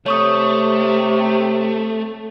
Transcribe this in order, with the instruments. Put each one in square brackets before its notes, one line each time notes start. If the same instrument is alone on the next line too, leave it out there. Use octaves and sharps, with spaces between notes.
[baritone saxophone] C3 [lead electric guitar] A3 [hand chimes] C#5 C#6 D#6